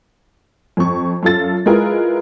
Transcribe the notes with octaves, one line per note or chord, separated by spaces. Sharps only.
F2 C#6
F#2 F4 A4 A6
G#3 E4 F4 G#4 A#4 B4